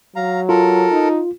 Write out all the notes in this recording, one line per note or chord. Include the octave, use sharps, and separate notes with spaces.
F#3 F5 A#5
F4 A4 A#4
D#4